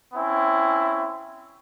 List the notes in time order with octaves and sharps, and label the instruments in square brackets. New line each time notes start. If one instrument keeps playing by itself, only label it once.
[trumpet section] C4 C#4 E4